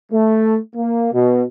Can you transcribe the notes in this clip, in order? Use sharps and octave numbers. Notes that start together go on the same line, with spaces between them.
A3
A#3
B2